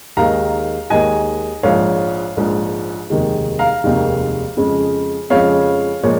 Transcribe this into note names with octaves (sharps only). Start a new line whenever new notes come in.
D#2 D#3 G#3 F5 A#5
D#2 D#3 G#3 D#5 G#5
A#1 G#2 F3 C#5 F5
A#1 G#2 F3
F1 D#2 D#3 G#3
F5 A#5
F1 D#2 D#3 G#3
F2 C#3 F3 G#3
F2 C#3 F3 G#3 C#5 F5
A#2 F3 G#3 C#5